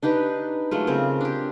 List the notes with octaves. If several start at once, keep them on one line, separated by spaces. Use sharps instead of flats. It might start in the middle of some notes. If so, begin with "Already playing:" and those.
D4 D#4 G4 B4
F#3 G#3 A3 F4
C#3 C4 A#4
D4 G4